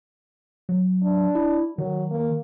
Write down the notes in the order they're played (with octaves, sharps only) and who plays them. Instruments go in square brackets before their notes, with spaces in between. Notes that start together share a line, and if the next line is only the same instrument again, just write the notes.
[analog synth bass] F#3
[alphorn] D4
[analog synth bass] E4
[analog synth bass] D#3 [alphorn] F#3
[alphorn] A#3